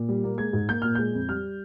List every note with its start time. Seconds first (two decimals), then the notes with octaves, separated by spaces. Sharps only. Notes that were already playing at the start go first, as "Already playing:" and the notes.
Already playing: A#2
0.08 G3
0.24 A#3
0.38 G#3 G#6
0.53 G#2
0.69 A#3 G6
0.82 A#2 F6
0.95 G#3 G6
1.14 F2
1.29 G3 F6